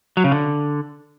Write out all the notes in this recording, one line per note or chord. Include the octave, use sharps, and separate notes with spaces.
F#3
C#3
D3